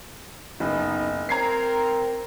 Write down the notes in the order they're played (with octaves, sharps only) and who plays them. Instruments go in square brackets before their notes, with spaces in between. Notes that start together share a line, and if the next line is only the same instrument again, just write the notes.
[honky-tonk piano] F#1 [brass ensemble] B3 D#4
[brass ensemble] C4 A#4 [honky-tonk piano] A#5 G#6 C7